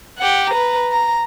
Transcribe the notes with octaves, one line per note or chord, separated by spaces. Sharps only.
G4 F#5
B4 A#5
A#5